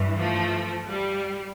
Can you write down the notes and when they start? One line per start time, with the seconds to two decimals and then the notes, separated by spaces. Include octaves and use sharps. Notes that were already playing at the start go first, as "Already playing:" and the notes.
Already playing: G2 E3
0.17 F3 A3
0.90 G3